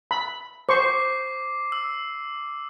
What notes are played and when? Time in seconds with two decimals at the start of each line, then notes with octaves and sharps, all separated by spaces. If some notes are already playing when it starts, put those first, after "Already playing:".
0.11 B5
0.69 C5 C#6 D6 C7
1.72 E6